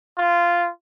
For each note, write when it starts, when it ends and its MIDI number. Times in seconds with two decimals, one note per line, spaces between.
0.17 0.68 65